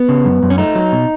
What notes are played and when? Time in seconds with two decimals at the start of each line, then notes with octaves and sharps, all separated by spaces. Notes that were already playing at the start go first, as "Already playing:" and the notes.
Already playing: B3
0.09 C#3
0.25 F#2
0.43 F#2
0.50 C#4
0.58 A3 D#4
0.75 F#3
0.92 B2